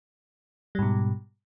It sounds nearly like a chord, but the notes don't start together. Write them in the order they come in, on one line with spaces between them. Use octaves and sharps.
G3 G#2 B2